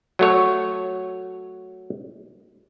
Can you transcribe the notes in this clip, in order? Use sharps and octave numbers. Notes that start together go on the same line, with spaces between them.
F#3 A3 C#5